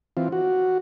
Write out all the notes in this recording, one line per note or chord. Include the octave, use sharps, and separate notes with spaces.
E3 C4 F4
F#4